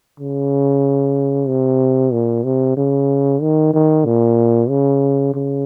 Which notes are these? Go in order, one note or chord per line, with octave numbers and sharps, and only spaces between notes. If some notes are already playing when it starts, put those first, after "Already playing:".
C#3
C3
A#2
C3
C#3
D#3
D#3
A#2
C#3
C#3